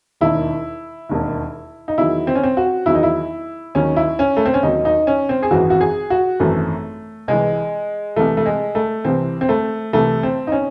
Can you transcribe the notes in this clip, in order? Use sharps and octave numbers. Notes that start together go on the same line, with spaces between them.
E1 D#2 D#3 E4
E1 D#2 D#3
D#4
E2 D#3 F#3 E4
C4
C#4
C4
F#4
E2 D#3 F#3 E4
D#4
E4
D#2 D#3 F#3 C#4
E4
C#4
A3
C4
C#4
D#2 D#3 F#3 D#4
D#4
C#4
C4
G#4
G#1 F#2 E3 F#4
F#4
G#4
F#4
G#1 F#2 E3 A3
C2 C3 E3 G#3
C2 C3 E3 A3
A3
G#3
A3
C2 C3 E3 C4
C4
A3
C2 C3 E3 A3
C4
D#4
C#4